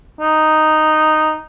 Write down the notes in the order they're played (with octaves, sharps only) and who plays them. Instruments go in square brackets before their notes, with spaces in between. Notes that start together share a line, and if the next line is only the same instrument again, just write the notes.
[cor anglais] D#4